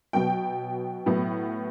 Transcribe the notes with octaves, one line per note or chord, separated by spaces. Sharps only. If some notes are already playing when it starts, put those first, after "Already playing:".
B2 F#3 B3 G5
A2 F#3 B3